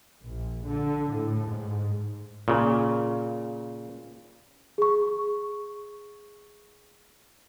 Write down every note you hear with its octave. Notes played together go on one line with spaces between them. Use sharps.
A#1
D3
A2
G#2
A#2 C#3
G#4 C#6